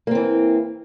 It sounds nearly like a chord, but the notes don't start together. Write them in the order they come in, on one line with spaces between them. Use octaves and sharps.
A#3 C4 E3